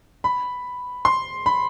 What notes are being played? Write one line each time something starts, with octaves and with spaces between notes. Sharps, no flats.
B5
C6
B5